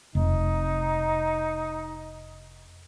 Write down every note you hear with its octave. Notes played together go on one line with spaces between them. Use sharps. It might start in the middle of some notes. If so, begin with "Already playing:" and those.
F1 D#4